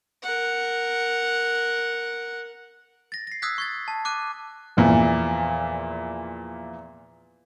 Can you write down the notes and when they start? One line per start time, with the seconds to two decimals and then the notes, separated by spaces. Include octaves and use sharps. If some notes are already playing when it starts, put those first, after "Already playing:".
0.23 A#4 F#5
3.12 A6 A#6
3.27 A#6 C7
3.42 D#6 E6 F#6 G#6 B6
3.58 C#6 G#6 A6
3.88 A5
4.05 D6 F#6 D#7
4.77 E2 A#2 E3 F3